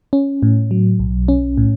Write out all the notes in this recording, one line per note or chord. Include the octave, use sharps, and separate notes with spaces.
C#4
A2
F#3
B1
C#4
A2